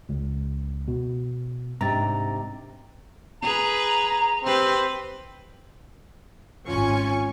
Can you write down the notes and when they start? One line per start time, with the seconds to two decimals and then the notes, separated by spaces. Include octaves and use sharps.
0.09 C#2
0.88 B2
1.81 G#2 C3 D4 A#5 A6
3.43 G#4 B4 A#5
4.44 C4 G4 B4 C5
6.65 G#1 C#4 F4 G#5 C#6